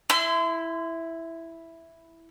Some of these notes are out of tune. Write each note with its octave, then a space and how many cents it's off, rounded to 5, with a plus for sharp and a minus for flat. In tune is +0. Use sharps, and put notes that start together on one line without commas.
E4 +0 C6 -35 E6 +35